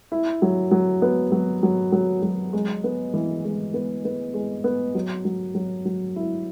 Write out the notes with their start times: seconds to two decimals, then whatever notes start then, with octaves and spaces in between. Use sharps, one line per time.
0.12 E4
0.42 F#3
0.71 F#3
1.02 B3
1.32 F#3
1.63 F#3
1.92 F#3
2.23 F#3
2.53 G#3
2.84 B3
3.14 E3
3.44 G#3
3.74 B3
4.05 B3
4.34 G#3
4.64 B3
4.95 F#3
5.25 F#3
5.55 F#3
5.85 F#3
6.16 E4